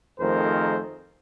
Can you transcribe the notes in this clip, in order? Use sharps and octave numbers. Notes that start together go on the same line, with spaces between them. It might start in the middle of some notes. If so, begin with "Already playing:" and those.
F2 D#3 A3 G#4 A#4 C5